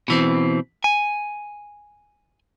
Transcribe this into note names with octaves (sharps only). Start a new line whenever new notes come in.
B2 E3 C4
G#5